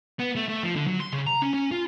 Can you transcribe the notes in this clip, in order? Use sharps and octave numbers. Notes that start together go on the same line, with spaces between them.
B3
A3
A3
F3
D3
F#3
C6
C#3
A#5
C#4
C#4
F4